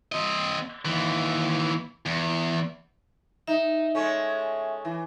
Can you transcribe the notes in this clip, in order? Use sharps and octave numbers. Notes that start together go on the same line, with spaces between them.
C4 D#5
D#2 E3
E2
D#4 E5
G#3 A3 C#4
E3